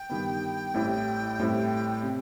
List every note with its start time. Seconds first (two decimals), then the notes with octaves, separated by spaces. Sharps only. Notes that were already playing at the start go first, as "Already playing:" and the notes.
Already playing: G5
0.10 G2 D#3 G3 B3
0.74 A1 A2 G3 C4 E4
1.39 A1 A2 G3 C4 E4
2.03 C3 G5